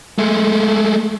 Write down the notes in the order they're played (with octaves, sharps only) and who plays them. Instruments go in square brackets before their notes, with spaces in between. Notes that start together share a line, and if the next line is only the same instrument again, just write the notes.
[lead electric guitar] G#3 A3